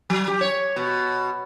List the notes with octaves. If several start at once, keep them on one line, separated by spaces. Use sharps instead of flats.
F#3
G4
C#5
B2